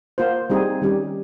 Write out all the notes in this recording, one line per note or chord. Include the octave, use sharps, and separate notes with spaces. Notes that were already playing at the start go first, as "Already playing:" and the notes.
A#3 F4 C5
G3 C4 D#4 G#4
D#3 G3 C#4 G4